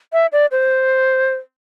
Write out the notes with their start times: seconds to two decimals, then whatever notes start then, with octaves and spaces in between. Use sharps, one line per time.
0.13 E5
0.32 D5
0.52 C5